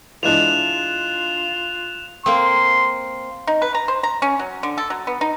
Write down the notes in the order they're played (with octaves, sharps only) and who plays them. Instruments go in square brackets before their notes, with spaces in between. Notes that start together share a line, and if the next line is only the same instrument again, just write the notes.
[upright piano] E3 G#3 D4 [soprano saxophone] F4 [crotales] F#6 E7 F7
[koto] A#3 C4 [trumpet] C6
[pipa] D#4
B4
A#5
C5
A#5
C#4
F#3
D3
A4
F#3
B3
D#4